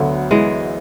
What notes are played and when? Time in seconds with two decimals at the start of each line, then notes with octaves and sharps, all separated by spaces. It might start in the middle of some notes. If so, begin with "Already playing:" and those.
Already playing: D2 D3 F#3 B3
0.31 E3 G#3